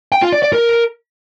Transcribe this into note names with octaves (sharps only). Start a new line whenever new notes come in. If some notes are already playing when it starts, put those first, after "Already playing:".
G5
F4
D5
D5
A#4